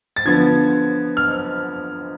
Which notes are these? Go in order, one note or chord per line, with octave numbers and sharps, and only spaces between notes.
A6
D3 F3 B3 G#6
F6